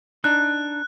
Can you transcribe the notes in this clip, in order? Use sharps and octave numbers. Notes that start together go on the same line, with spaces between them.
D4 D#4 F#6